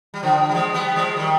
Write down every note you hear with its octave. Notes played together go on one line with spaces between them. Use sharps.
G3
D3 F3
G3
F3 G#3
G3 B3
F3 G#3
D#3 G3